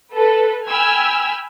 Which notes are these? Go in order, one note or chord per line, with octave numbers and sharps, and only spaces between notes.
A4 B4
G5 G#5 B5 E6 F6 G#6